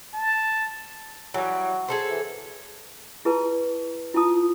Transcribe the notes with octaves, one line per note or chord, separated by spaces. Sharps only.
A5
E3 F#3 G3
G#4 A4 C5
E3
E4 G#4 B4 A5
E4 F4 A5 D#6